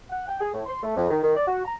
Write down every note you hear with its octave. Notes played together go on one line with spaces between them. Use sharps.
F#5
G5
G#4
A2
C6
A3
F2
D#3
D#3
D5
F#4
A#5